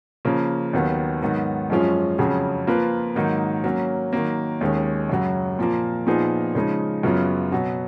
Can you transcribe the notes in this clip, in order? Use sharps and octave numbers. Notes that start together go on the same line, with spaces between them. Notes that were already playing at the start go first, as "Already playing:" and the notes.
C#3 F3 A#3 C#4
D#2 D#3 F#3 B3
G#2 D#3 F#3 B3 F#4
F#2 F3 G#3 C#4 F4
F2 C#3 F#3 C#4 G#4
F3 A#3 F4 B4
G#2 D#3 F#3 A#3 D#4
F#3 A#3 C#4
D#3 F#3 A#3
D#2 D#3 G#3 C#4
F#2 C#3 F#3
A#2 F3 A#3
A#2 F3 B3 D#4 G#4
C#3 F3 G#3 D#4
F#2 C#3 F#3 B3 F4
B2 F#3 B3